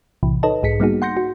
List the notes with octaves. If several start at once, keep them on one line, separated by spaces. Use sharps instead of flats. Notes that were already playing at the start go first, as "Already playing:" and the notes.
B1 A2 C3 E3
D#4 A4 B4 C#5 D#5 A5
B1 G#2 G#4 B6 C#7
G3 A#3 B3 D#4 F#4 G#4
F#5 C6 G6 A#6 C#7
F#4